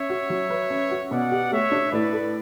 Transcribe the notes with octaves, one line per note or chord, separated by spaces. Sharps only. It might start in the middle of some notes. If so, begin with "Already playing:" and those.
Already playing: C#4 C#5 E5
F#4
F#3
B4
C#4
F#4
B2 D5 F#5
G4
A3 C#5 E5
D4
A2 B4 D5
A4